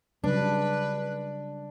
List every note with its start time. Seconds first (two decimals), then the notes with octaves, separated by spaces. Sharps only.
0.24 C#3 F#3 G3 D4 B4